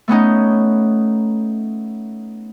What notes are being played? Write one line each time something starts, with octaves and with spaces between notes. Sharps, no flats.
A3 B3 C#4 D#4